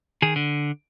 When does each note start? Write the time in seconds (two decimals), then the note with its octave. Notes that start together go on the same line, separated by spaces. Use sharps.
0.22 D#3 G#4
0.36 D3